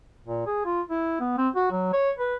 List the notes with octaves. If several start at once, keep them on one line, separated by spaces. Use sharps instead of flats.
A#2
G#4
F4
E4
B3
C4
F#4
F#3
C#5
B4